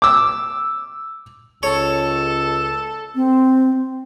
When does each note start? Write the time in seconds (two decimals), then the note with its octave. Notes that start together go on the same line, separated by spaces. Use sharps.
0.02 D6 E6
1.63 C#2 A4 C#5
3.15 C4